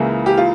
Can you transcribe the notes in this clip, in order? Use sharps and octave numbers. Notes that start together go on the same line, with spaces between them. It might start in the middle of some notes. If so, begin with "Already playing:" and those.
Already playing: C#2 C#3 E3 A#3 E4
G4
F4